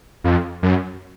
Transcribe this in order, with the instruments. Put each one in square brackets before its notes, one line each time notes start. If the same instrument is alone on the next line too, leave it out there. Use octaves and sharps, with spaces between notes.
[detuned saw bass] F2
F#2